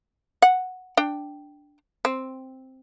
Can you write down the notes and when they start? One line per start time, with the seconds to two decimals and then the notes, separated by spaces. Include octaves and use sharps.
0.42 F#5
0.97 D4 G5
2.05 C4